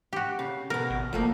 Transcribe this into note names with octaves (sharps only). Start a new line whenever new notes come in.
F#4 G4
C#3
B2 B3 A#4
G#1
F#1 F3 A3 A#3